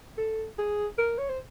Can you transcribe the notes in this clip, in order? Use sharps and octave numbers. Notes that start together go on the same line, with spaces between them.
A4
G#4
A#4
C#5
C5